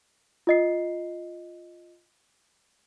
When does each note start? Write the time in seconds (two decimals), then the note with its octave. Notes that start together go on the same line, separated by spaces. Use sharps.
0.47 F4 D#5 C7